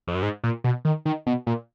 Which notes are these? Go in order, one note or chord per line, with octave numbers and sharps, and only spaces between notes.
F2
F#2
G#2
A#2
B2
D#3
D#3
B2
A#2